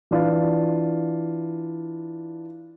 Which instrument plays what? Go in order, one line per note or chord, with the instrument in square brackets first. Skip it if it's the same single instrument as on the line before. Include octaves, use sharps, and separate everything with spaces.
[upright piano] E3 D4 F4